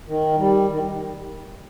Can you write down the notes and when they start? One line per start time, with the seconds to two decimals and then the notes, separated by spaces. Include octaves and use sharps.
0.07 D#3
0.38 G3
0.70 D#3